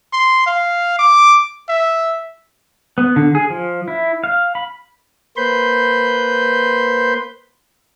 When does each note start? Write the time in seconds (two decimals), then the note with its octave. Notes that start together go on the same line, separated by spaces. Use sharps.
0.13 C6
0.47 F5
0.99 D6
1.69 E5
2.98 B3
3.16 D3
3.35 G#4
3.50 F3
3.88 E4
4.24 F5
4.55 B5
5.37 A#3 B4 C5 B5 C6 G6